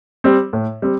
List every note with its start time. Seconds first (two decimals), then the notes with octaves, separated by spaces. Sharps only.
0.24 G3 C4
0.53 A2
0.82 G3 C4